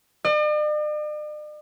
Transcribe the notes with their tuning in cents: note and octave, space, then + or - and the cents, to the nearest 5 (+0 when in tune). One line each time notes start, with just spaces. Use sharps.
D5 +45